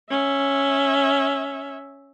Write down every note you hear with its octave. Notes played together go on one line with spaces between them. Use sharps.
C#4 E5